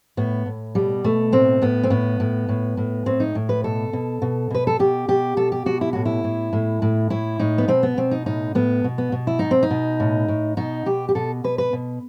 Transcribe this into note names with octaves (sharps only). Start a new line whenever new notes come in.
A2 B3
A2
B2 G3
B2 A3
A2 C4
A2 B3
C4
A2 B3
A2
A2
A2
A2 C4
D#4
A2
B4
B2 A4
B2
B2
B2 B4
A4
B2 G4
B2 G4
B2 A4
G4
B2 F#4
E4
A2 F#4
E4
A2
A2
A2
A2 E4
A2 D#4
B3
B2 C4
B3
B2 C4
D#4
A2 D#4
A2 B3
B2
B3
B2
E4
B2 D#4
C4
D#4
B2
A2
A2
B2 D#4
B2 G4
G4
B2 A4
B2 B4
B4
B2